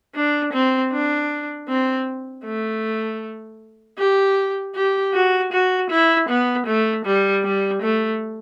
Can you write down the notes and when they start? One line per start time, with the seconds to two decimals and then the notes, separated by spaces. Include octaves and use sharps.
0.15 D4
0.53 C4
0.92 D4
1.68 C4
2.45 A3
3.98 G4
4.75 G4
5.14 F#4
5.52 F#4
5.90 E4
6.29 B3
6.66 A3
7.05 G3
7.44 G3
7.82 A3